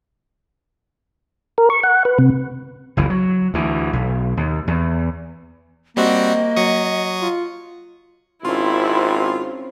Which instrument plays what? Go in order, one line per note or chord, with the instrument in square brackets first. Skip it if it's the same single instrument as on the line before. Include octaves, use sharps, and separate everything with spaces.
[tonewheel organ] A#4
C#6
F#5
B4
C3
[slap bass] F#1 C#2 E3
F#3
D2 E3
B1
D#2
E2
[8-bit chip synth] G3 C4 F#4 [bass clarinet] A#3 [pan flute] D#5
[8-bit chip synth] F#3 C#6 D#6
[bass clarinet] F4
[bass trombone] G#1 [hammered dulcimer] C4 C#4 C6 [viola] E4 [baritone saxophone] F4